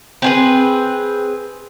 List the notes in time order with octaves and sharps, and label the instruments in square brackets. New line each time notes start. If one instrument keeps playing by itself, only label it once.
[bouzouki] C4 G#4 B4